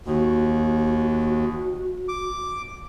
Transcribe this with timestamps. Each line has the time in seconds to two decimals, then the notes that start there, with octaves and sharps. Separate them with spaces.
0.06 D#2 F#4
2.08 D6